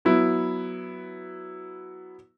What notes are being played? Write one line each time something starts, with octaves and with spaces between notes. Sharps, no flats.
F#3 B3 E4